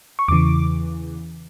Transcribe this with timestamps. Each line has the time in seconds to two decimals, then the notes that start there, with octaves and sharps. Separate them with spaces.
0.19 C#6
0.28 E2 C#3 E3 D6